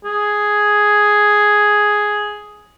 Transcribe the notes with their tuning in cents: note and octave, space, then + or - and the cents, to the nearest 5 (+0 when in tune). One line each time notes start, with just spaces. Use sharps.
G#4 +5